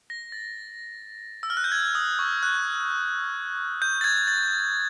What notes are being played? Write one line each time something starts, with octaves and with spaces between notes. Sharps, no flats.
A#6
A6
E6
F6
F#6
G6
G#6
D#6
C#6
F#6
G6
A6
G#6
A6